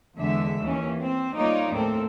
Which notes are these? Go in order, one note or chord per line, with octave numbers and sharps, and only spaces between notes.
E2 D3 G#3 E5
D#2 E3 C#4
C4
G3 A#3 D#4 F4 C#5 D5
D#2 A2 C4 A4 A#4